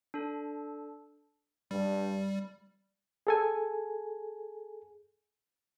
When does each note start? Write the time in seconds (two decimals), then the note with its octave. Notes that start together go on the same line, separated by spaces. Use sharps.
0.14 D4 A4
1.71 G2 G3
3.27 G#4 A4 G#5